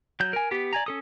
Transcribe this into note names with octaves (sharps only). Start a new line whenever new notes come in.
F#3 G6
A#4 G#5
B3 G4
D5 G#5 A#5
C#4 A4 D#6